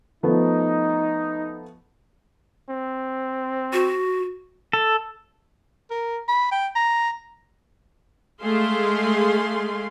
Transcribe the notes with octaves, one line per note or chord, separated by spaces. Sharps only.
F3 A3 B3 D#4
C4
F#4
A4
A#4
B5
G5
A#5
G#3 A3 G#4 F5 C6